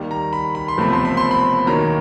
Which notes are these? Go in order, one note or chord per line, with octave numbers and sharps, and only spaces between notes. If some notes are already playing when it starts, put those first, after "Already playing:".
Already playing: D#2 D#3 G3
A#5
B5
B5
C6
F#1 E2 C3 F3 A3 B5
C6
B5
C6
B5
E1 D#2 D#3 F#3 A#3 A#5